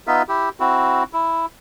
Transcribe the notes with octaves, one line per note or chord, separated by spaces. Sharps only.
B3 D#4 F4 E5
E4 G4
C4 E4 F#4
E4